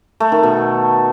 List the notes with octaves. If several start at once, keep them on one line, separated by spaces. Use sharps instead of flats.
A3
D#3
B2